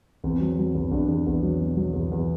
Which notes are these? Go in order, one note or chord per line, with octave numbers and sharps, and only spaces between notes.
E2 C4
F#3
F#3
E2
E2 D4
E2
E2
F#3
B2
F#3
E2
E2